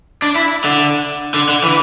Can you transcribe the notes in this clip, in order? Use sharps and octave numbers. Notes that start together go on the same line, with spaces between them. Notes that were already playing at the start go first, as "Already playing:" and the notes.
D4
E4
D3
D3
D3
E3